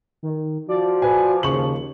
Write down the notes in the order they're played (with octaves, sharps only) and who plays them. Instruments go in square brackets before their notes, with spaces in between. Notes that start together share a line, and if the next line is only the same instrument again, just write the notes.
[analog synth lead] D#3
[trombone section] F3 [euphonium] F#4 [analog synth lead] D5
[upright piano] B4 G#5
[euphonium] D#2 [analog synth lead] C#3 [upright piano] C#6 F#7